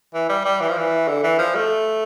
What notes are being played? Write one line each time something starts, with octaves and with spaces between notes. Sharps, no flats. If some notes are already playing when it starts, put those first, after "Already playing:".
E3
G3
G3
E3
F3
E3
D3
E3
F3
A3